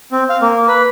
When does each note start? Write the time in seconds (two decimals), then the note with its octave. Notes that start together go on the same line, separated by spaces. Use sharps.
0.12 C4
0.30 F5
0.41 A#3
0.68 B4